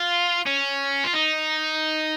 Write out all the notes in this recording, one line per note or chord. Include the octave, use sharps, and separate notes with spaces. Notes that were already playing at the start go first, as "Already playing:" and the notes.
Already playing: F4
C#4
F4
D#4